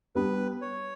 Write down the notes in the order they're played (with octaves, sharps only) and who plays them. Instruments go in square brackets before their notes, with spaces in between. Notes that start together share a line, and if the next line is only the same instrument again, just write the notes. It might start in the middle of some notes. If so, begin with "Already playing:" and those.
[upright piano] G3 B3 D4 G4 [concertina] B4
[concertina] C#5